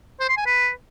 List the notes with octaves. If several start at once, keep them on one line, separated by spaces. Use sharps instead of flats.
C5
C6
G#5
B4